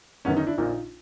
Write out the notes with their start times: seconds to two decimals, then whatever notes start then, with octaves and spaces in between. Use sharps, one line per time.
0.25 G1 F#2 D#3 B3 C#4
0.37 C#4 D#4
0.47 D4 E4
0.58 A#1 A#2 D#4 F4